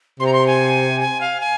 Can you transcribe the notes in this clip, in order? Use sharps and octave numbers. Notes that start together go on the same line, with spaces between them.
C3 C6
A#5
C6
G#5
G#5
F5
G#5